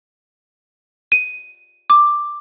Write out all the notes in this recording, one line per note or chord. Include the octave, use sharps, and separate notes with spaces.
D#7
D6